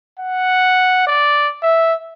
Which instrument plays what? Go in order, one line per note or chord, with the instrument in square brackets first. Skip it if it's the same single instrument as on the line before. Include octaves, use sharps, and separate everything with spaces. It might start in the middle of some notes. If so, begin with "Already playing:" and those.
[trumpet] F#5
D5
E5